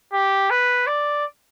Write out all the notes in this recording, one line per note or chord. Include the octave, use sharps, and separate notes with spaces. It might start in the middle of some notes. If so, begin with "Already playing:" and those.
G4
B4
D5